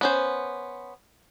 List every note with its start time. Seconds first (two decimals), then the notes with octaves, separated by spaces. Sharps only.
0.01 B3 C#4 C5